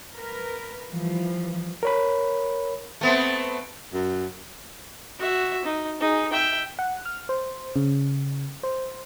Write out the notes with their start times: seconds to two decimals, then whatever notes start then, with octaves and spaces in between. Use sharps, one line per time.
0.14 A#4 B4
0.89 E3 F3 G3
1.83 A#4 C#5 B5
3.01 A3 B3 C4
3.93 F#2
5.19 F#4 E5
5.65 D#4
6.01 D#4 G#4
6.32 E5 G5
6.79 F#5
7.05 F6
7.29 C5
7.76 C#3
8.63 C5